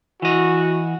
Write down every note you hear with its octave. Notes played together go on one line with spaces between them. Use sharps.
E3 F#4 D#5